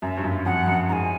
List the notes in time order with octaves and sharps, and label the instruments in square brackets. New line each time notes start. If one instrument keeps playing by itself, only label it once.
[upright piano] F#2 [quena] E5
[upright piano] G2
F#2
[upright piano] F2 [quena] F#5
[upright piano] F#2
[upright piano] G#2 [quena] G#5 A#5